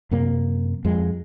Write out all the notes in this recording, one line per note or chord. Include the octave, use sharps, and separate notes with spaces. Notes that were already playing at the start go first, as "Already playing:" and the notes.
F#2 C3 A#3
F2 G#3